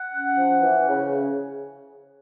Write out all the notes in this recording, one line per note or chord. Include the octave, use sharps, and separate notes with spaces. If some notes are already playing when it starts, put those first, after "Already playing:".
Already playing: F#5
C#4
F3
E3
C#3